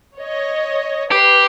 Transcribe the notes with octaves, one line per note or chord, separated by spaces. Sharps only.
C#5 D#5
G4 B4 C7